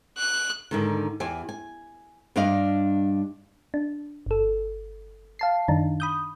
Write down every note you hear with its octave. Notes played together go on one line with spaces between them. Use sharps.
F#6
G#2 D3 D#3
E2 G4 G#5
G#5
G2 G3 D4 D#5 F5
D4
G1 A4
F5 A5 C7
F#2 D#3 D4 D#4
B5 D#6 G6